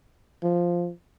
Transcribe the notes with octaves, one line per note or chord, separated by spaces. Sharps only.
F3